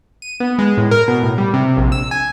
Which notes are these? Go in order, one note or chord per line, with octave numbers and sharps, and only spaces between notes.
D#7
B3
G#3
A2
A#4
B2
A2
G3
C3
A#1
E6
G#5